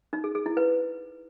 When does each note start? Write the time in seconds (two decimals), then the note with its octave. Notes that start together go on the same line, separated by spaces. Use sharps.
0.13 D#4
0.24 G#4
0.35 G#4
0.46 E4
0.57 B4